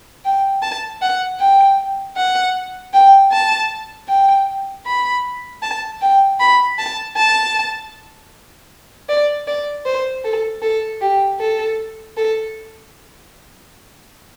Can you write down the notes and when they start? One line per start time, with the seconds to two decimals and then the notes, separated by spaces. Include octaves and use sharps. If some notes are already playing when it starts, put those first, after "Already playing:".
0.25 G5
0.63 A5
1.01 F#5
1.40 G5
2.17 F#5
2.94 G5
3.32 A5
4.09 G5
4.86 B5
5.63 A5
6.01 G5
6.40 B5
6.79 A5
7.17 A5
9.09 D5
9.47 D5
9.86 C5
10.24 A4
10.62 A4
11.01 G4
11.40 A4
12.17 A4